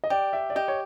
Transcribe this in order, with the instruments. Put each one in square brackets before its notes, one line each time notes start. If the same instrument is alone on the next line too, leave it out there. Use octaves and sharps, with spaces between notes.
[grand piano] D#5
[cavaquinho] G4 [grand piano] D5
[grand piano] E5
D5
[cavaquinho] G4 [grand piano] D#5
[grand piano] C#5